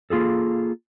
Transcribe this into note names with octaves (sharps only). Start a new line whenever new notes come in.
A#3 F4 G#4 A4